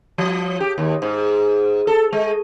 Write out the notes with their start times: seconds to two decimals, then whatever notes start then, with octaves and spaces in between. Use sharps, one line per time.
0.18 F3
0.60 G4
0.78 D#2
1.02 G#2
1.87 A4
2.13 G#3